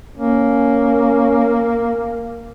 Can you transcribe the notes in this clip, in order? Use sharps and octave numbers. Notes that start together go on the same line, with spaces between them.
A#3 C#4